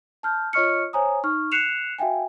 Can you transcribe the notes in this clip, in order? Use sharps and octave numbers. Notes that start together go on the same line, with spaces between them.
A5 F6 G6
F4 C#5 D#5 C#6 F6 C#7
C5 C#5 G#5 A#5 D#6
D#4 C#6 F6
F#6 C7 C#7 E7 F7
F#4 E5 F5 G5 G#5